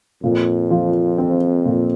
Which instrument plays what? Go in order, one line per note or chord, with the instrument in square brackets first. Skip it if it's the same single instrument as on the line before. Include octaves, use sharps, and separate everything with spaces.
[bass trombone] F2 [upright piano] A#2
[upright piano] F3
C4
A#2